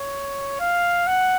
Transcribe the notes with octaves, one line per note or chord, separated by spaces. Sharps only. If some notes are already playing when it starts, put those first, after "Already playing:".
Already playing: C#5
F5
F#5